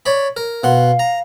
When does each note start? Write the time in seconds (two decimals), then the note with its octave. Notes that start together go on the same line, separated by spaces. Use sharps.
0.06 C#5 D5 B5
0.37 A#4
0.64 B2 F5 F#5 C6
0.99 A#5